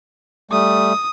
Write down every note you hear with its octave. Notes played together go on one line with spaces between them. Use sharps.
G3 A3 D#6